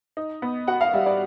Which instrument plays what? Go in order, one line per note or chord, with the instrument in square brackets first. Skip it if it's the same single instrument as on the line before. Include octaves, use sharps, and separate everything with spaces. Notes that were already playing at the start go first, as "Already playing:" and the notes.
[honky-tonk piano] D#4
B3
[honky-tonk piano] F#4 [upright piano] F#5
[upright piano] F5
[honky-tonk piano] G3 [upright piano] E5
[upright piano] D5